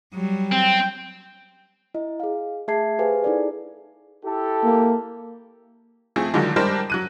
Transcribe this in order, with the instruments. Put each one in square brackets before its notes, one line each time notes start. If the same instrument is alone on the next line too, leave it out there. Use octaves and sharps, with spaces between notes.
[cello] F#3 G3
[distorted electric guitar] C4 [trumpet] G5
[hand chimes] E4 D#5
G#4 F5
A3 G#4 E5 A5 G#6 C7
G4 G#4 B4 C5 F5 G#5
D#4 E4 G#4 A4 D5
[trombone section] E4 G4 A4
[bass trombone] A#3
[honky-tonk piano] F3 A3 C4 G#4
D3 D#3 F3 F#3 G#3
G3 G#3 D4 G4 A#4 C5
F#3 F#6 D#7